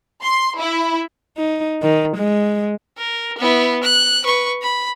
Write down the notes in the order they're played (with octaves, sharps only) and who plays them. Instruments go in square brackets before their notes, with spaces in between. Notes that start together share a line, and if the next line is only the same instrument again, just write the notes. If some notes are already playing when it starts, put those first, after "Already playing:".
[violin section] C6
E4
[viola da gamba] D#4
D#3
G#3
[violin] A#4
B3 E4
F#6
B4 C#6
B5